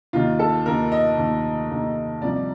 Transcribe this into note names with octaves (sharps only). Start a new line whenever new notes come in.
D#2 D#3 F4
A4
D#2 D#3 A#4
D#5
D#2 D#3
D#2 D#3
C2 C3 F3 D5